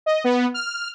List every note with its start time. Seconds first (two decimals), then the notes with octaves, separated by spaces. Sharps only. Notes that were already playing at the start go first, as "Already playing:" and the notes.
0.06 D#5
0.24 B3
0.54 F6